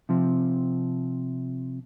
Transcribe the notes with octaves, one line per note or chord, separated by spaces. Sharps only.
C3 F3 C4